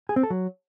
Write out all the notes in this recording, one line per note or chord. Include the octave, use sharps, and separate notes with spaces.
G#4
C4
A4
F#3